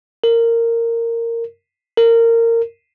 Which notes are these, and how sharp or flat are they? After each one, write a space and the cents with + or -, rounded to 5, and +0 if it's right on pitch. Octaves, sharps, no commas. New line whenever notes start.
A#4 -15
A#4 -20